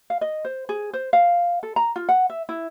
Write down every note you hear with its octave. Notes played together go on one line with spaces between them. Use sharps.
F5
D#5
C5
G#4
C5
F5
A4
A#5
F4
F#5
E5
E4